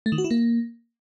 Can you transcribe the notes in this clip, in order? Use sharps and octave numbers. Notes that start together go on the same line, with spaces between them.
A3
D#3
F#4
E4
A#3